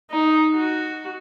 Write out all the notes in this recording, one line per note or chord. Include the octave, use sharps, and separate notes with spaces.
D#4
F#4